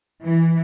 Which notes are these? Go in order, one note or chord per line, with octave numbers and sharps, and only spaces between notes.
E3